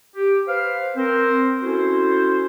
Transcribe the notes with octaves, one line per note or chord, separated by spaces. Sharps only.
G4
B4 C5 F5
C4 A#4 C5
C#4 E4 F#4 A4 C5